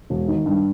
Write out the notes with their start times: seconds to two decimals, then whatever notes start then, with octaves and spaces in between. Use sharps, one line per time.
0.10 E1
0.28 D#3
0.46 G2